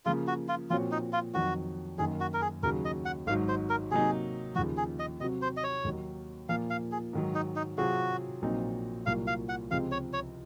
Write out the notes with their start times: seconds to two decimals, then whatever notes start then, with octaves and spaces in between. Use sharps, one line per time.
0.05 C#3 F3 A#3 F4
0.27 F#4
0.49 F4
0.70 A#2 F3 C4 F4 F#4 C#5
0.91 D#4
1.13 F4
1.34 F2 D#3 F#3 F#4
1.98 F#2 D#3 A#3 G#4
2.20 F#4
2.34 A#4
2.41 G#4
2.63 D#2 C#3 F#3 A#4
2.85 D#5
3.05 F#5
3.27 G#1 G#2 F#3 F5
3.49 C5
3.70 A#4
3.91 C3 F#3 A#3 D#4 G#4
4.55 D#2 C#3 F3 F#4
4.77 G#4
4.99 D#5
5.20 C3 F#3 C4 F#4 D#5
5.42 C5
5.57 D#5
5.64 C#5
5.84 D#2 D#3 F#3
6.49 A#2 F3 A#3 F5
6.70 F5
6.92 G#4
7.13 G#2 D#3 F#3
7.35 D#4
7.56 D#4
7.78 C3 F#3 C4 F4 F#4 G#4
8.42 A#1 A#2 F#3 C4 D#4
9.06 C2 A#2 F#3 A#3 F4 F5
9.27 F5
9.49 F#5
9.71 C#2 C3 F3 G#3 C4 F5
9.92 C#5
10.13 C#5